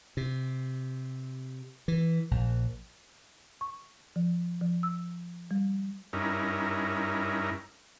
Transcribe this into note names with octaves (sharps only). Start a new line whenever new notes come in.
C3
E3
A#1
C#6
F3
F3
E6
G3
G2 C#4 D#4 E4 A#4